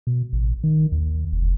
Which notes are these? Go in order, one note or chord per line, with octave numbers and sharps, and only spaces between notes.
B2
A1
D#3
D#2
F1